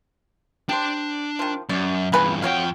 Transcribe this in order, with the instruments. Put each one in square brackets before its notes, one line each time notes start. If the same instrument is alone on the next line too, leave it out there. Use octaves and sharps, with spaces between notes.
[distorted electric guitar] D4 A5 [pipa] G4 C5
[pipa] D#3 F3
[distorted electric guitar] F#2 [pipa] D5
[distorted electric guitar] E2 G2 [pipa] C#3 B4 G#5
[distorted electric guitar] F2 G5 [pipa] F#4 C#5 F5